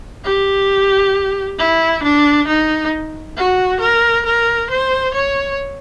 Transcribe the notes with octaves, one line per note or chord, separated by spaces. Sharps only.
G4
E4
D4
D#4
F#4
A#4
A#4
C5
C#5